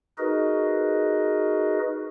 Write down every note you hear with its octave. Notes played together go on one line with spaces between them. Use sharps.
D#4 F#4 G#4 A#4 B4 D#5